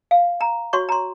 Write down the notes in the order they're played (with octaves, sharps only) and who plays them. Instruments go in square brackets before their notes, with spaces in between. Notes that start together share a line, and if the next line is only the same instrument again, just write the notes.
[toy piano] F5
A#5
F#4 C#5 C6 C#6
A#5 C6